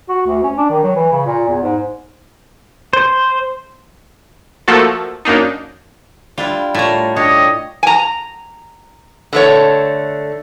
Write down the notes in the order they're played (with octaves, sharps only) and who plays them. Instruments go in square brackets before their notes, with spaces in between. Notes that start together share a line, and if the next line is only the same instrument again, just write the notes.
[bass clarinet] F#4
D2
C#4
D4
D#3
F#3
E3
C#3
A#2
E2
G#2
[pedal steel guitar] C5
[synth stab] F3 A3 A#3 F#4 A4
F#2 A#3 D4 D#4
[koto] G3 D4 E4 [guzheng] F4
[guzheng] A2 [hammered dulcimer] F4 C#5 [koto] D5 A#5
[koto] D4 [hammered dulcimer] G4 [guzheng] C#5 [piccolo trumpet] D#5
[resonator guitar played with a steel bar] G#5 A#5
D3 A3 C#5